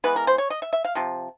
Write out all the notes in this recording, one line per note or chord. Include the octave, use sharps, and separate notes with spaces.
E3 G#3 B3 B4
A#4
C5
C#5
D#5
E5
E5
F5
C3 F3